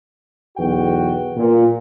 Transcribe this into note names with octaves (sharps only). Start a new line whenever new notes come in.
B1 E2 F#4 B4 G5
A#2